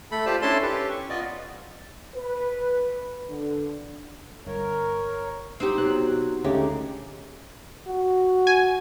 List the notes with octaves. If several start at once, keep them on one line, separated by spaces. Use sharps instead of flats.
A3 A4 B5
F4 G4 C5 D5 A5
C#4 D4 E4 A4 A5 C6
C#4 G4 A4 B4
C#6
B3 F4 D5 D#5
B4
D3
G1 A#4 C#5
C4 D#4 G4
B2 F#3 F#6
D2 C#3 G#3 A3 D#4 G4
F#4
G#5